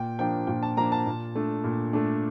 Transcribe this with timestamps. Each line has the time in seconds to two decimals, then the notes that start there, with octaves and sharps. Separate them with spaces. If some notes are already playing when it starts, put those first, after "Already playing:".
Already playing: A#2 G5
0.19 F3 A#3 D4 G5
0.47 A#2 G5
0.63 A5
0.77 F3 A#3 D4 A#5
0.92 A5
1.06 A#2
1.35 A3 D4
1.64 A#2
1.93 A3 D4